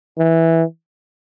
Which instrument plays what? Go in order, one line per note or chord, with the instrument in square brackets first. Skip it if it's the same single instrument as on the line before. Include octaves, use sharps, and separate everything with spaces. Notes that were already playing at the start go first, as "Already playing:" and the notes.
[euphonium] E3